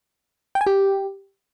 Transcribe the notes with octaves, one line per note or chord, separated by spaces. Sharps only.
G5
G#5
G4